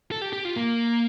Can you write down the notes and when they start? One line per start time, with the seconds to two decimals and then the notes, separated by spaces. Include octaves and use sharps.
0.12 A4
0.22 G4
0.33 G4
0.45 F4
0.56 A#3